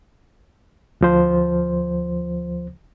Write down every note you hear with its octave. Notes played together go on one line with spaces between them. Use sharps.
D2 F3 C5